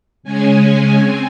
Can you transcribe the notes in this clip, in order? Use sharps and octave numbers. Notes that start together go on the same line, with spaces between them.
C#3 G#3 C#4 G#5
C4